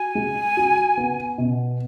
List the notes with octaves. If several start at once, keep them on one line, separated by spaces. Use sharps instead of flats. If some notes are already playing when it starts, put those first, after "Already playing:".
Already playing: F#4 G#5
G#3
F#4
B3
B2